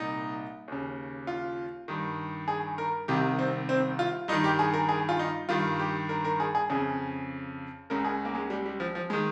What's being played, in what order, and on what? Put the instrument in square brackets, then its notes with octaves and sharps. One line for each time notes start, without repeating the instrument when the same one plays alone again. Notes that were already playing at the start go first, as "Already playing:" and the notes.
Already playing: [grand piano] C2 A#2 D#4
D#2 C#3
F4
G2 D#3
G#4
A#4
C2 C3 D#3 G4
C4
C4
F4
G2 D#4
D#3
G4
G#4
A#4
G#4
F4
D#4
G2 D#3 F4
G4
A#4
A#4
G#4
G#4
F2 C#3 G#4
C#2 C#3 A#4
G#4
A#3
G#3
G3
G3
F3
F3
D#3 G#3